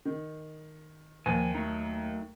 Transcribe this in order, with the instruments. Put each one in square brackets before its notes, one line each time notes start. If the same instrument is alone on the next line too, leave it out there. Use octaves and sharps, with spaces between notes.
[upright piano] D#3
[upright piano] D#2 [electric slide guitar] F3 G#5
[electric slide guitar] F#3 A3 D#4